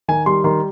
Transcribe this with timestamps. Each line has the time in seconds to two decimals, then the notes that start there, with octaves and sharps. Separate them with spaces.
0.08 D#3 G#5
0.26 G3 C6
0.44 D#3 C6